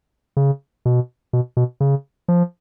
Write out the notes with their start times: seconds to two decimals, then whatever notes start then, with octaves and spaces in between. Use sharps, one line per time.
0.37 C#3
0.85 B2
1.33 B2
1.57 B2
1.80 C#3
2.28 F3